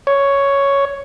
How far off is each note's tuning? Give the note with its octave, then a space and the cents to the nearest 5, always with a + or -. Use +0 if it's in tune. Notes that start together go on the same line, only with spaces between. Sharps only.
C#5 +5